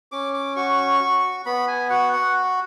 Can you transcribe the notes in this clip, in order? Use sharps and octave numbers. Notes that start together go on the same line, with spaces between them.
C#4 D6
D6
F#4 C#6
F#4
B3 B5
G#5
F#4 F#5
F#5